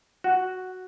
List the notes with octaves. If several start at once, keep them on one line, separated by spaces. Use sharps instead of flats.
F#4